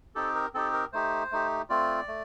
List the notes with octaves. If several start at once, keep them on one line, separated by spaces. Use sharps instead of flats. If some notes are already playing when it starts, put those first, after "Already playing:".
C4 D#4 G4 A4
A#4
C4 D#4 G4 A4
A#4
A3 D#4 G4 C5
A3 D#4 G4
A3 C4 F4 D5
A3